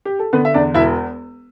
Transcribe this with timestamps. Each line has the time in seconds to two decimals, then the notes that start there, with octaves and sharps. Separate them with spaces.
0.05 G4
0.19 A4
0.33 D3 B3 B4
0.45 E5
0.54 E2 D4 D5
0.74 E1 E4 E5